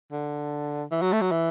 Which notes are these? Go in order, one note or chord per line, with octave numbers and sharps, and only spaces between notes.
D3
E3
F#3
A3
F#3
E3